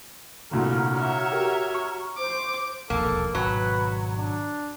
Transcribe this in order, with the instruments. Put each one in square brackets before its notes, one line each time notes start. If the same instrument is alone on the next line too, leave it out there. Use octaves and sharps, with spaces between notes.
[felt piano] G1 C2 A#2 [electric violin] A3 [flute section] F#4 A#5 F6
[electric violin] C#5 E5
[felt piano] G4 A#4
C#6
[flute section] C5 [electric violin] D6
[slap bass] E1 A#1 D#2 [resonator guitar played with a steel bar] A#3 [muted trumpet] A4
[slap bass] G#1 B2 [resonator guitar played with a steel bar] F#3 [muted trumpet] B4
[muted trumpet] D4